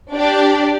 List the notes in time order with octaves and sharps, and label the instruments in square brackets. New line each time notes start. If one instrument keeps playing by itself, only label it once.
[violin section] D4 G4 D5